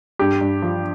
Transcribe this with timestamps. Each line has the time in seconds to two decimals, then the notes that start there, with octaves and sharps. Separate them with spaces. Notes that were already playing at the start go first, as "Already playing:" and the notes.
0.19 G2 G4
0.41 G2
0.62 F3